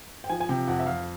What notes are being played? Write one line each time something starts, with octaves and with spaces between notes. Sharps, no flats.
G5
F3 G#5
G#5
C3 G5
F2 F#5
E5
F2 F5